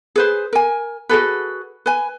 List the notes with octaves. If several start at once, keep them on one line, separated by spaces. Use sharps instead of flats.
G#4 B4 C5
A#4 G#5
F#4 G#4 A4 B4
B4 G#5